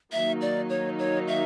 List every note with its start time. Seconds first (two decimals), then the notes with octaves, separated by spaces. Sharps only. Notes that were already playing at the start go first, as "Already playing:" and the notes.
0.12 D#3 F#3 A#3 D#4 E5
0.41 D5
0.69 C#5
0.99 C#5
1.28 E5